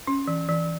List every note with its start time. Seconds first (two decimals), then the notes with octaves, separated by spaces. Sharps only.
0.07 C#4
0.28 E3
0.49 E3